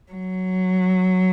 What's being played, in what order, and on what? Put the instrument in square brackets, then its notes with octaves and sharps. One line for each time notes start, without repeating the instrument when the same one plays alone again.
[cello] F#3